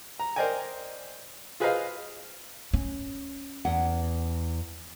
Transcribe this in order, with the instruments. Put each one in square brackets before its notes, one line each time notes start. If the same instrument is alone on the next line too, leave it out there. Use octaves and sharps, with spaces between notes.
[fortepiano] A#5
A#4 C5 D5 D#5 G5 G#5
F4 G#4 B4 C5 D#5 F5
[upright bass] C#4
[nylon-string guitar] E2 F#5